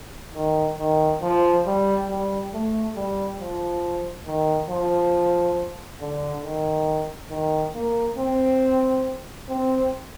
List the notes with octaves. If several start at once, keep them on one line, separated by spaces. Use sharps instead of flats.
D#3
D#3
F3
G3
G3
A3
G3
F3
D#3
F3
D3
D#3
D#3
A#3
C4
C4